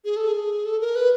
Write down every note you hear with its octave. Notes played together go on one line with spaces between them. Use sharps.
G#4
A4
G#4
A4
A#4
B4